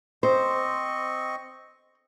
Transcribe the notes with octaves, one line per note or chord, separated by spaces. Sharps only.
C4 C5 D#5 C#6